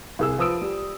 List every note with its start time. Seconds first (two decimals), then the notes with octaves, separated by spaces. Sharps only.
0.19 C2 G#4 E6
0.38 F3 B4 D#6 E6 D7
0.61 G3